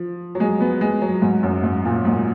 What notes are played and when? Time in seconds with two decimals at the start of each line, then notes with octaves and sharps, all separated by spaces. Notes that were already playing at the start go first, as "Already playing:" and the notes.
Already playing: F3
0.35 F#3
0.40 G#3
0.61 B3
0.81 G#3
1.02 F#3
1.22 G#2
1.43 F#2
1.64 G#2
1.85 A#2
2.05 G#2